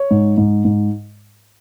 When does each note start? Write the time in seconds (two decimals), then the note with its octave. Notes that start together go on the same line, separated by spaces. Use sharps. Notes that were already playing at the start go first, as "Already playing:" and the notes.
Already playing: C#5
0.11 G#2
0.38 G#2
0.65 G#2